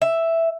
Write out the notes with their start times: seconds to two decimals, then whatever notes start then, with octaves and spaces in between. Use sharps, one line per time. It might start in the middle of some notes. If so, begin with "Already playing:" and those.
0.02 E5